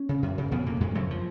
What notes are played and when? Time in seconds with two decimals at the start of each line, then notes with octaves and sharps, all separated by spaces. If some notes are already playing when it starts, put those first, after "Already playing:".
Already playing: C#4
0.09 C#3
0.23 F#2
0.38 C#3
0.51 F2 B2 B3
0.66 A#2 C#3 A#3
0.81 F2 G#2 G#3
0.95 F#2 C#3 F#3
1.11 F3